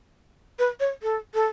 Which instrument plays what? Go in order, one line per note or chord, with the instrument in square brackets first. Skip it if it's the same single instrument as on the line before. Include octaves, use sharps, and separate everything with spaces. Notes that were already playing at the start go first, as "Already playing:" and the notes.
[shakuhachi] B4
C#5
A4
A4